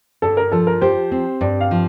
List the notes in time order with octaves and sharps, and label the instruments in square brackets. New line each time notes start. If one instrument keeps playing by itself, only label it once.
[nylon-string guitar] G2 [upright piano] A4
[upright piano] A#4
[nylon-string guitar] F3 [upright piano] A4
[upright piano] A#4
[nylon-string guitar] G4 [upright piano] C5
[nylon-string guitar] C4
[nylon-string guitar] G2 [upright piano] D5
[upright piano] F5
[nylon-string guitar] F3